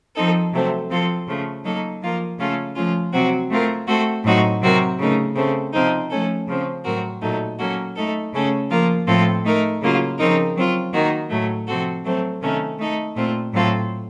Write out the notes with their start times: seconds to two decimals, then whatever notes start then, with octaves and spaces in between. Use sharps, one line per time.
0.16 F3 C4 D#4 A4
0.53 C3 F#3 A3 C4
0.90 F3 C4 F4 A4
1.27 C#3 F3 A3
1.64 F#3 A#3 D#4 A4
2.02 F3 A#3 F4 A#4
2.39 C#3 A3 C#4 F4 A4
2.75 F3 A3 C#4 F4
3.13 C3 F#3 C4 F#4
3.50 A3 C4 F4 A#4
3.88 A3 C4 F#4 A4
4.24 A2 F#3 C4 D#4 F#4
4.61 C3 F#3 C4 F#4 A#4
4.99 C#3 A3 D#4 A#4
5.35 C#3 A3 C4
5.73 C3 F3 C4 D#4
6.10 F3 A3 C#4 A4
6.47 C#3 F3 C4
6.85 A2 F#3 C4 F#4 A#4
7.22 A#2 F#3 A3 D#4
7.59 F#3 A#3 C#4 F#4 A4
7.96 A3 D#4 A4
8.33 C#3 A3 C#4 A4
8.70 F3 A#3 F4 A#4
9.07 A2 F3 C4 F4 A4
9.45 A3 D#4 A#4
9.82 C#3 F#3 A#3 F4
10.19 C#3 F3 C4 D#4 A#4
10.56 F#3 C4 F4
10.93 D#3 A#3 D#4 F#4 A#4
11.30 A2 F#3 A3
11.67 C3 F3 C4 F#4 A4
12.04 F#3 A3 C4
12.42 C3 D#3 A3 C#4
12.79 A3 D#4 A4
13.16 A#2 A3 C4 F4
13.53 A2 F#3 C4 F4 A4